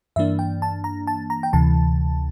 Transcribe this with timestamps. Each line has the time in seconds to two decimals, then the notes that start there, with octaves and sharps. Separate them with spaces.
0.16 G2 E3 A#3 D4 E5
0.39 G5
0.62 A5
0.84 A#5
1.07 A5
1.30 A#5
1.43 G5
1.53 D2 C3 E3 A5